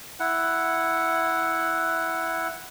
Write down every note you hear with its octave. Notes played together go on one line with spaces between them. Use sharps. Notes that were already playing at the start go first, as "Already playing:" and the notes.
E4 F#5